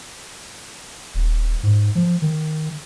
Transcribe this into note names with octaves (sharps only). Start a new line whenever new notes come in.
D#1
G#2
F3
D#3